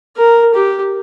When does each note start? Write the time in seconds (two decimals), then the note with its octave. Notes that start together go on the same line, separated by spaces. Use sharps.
0.17 A#4
0.54 G4